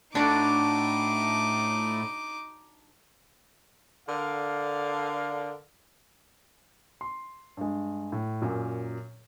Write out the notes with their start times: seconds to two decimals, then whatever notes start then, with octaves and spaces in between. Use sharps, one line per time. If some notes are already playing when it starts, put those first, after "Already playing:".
0.15 A2 D4 D#4 F#4 D5 D6
4.09 D3 A#4 F5
7.01 C6
7.57 G2 G#3
8.12 A2
8.42 F#2 A#2